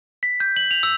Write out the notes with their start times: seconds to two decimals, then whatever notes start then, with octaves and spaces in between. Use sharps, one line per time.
0.23 B6
0.40 G6
0.56 F#7
0.71 F7
0.83 E6